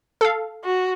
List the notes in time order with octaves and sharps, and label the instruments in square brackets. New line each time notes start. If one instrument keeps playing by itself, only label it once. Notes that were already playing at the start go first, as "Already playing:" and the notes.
[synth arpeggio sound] A4 F5
[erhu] F#4